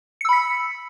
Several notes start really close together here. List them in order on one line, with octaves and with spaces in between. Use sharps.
C#7 E6 B5 B6